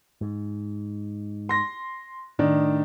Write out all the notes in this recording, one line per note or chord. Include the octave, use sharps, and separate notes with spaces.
G#2
C6 A#6
A2 D#3 D4